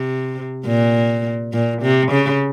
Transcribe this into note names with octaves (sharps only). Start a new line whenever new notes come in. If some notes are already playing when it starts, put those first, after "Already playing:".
Already playing: C3
A#2
A#2
C3
C#3